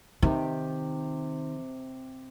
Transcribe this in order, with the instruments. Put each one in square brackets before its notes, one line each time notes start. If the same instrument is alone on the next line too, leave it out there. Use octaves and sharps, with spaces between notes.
[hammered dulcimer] C3 G4 [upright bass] D#3